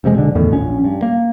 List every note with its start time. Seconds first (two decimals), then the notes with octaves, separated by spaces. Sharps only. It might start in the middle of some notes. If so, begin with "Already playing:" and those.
0.04 E1 C3 F3 G#3
0.16 B1 D3
0.35 E2 A2 D#3
0.51 A#1 C#4
0.84 G2
1.02 A#3